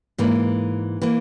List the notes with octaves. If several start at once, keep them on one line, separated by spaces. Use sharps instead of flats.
G#2 E3 A#3
E3 A#3